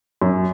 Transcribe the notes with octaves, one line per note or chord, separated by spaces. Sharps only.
F#2